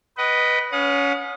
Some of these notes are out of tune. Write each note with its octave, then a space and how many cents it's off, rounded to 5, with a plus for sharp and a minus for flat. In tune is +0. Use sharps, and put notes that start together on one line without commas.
B4 -5 D#5 +0 F#5 +40
C#4 +20 F#5 -40 D#6 +0